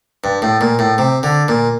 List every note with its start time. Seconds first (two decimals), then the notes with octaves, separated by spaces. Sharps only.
0.24 G2
0.42 A2
0.61 A#2
0.79 A2
0.98 C3
1.23 D3
1.48 A#2